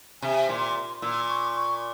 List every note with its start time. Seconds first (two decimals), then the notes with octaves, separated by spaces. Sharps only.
0.22 C3 G#5
0.49 A#2 C6
0.76 C6
1.02 A#2 E6
1.29 C#6
1.56 C#6